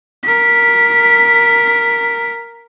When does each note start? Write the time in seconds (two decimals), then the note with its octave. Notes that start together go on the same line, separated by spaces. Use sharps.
0.23 A#4 B6